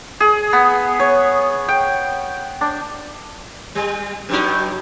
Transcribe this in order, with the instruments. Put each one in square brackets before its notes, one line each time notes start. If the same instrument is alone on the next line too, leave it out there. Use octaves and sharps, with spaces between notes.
[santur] G#4
B3
C#5
G5
D4
[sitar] G3
G2 F#3 D#4